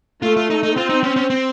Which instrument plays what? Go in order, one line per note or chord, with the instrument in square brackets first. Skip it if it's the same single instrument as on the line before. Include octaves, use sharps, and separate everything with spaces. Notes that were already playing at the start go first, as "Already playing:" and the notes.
[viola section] A3 [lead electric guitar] F4
[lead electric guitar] F4
D#4
D#4
[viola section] C4 [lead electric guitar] F4
[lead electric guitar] D#4
C#4
C#4
C4